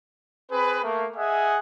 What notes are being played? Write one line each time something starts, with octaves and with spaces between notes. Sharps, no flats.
C4 G#4 B4
A3 A#3
G#4 D#5 E5 F#5 G#5